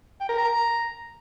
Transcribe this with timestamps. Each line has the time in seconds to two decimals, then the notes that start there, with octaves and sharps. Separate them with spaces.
0.21 G5
0.29 A#4
0.38 A#5